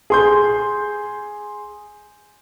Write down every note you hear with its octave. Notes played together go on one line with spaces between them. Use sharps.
G#4 C6 G6